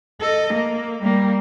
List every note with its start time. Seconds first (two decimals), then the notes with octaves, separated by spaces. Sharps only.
0.21 A4 D#5
0.54 A#3
1.03 G3 A#3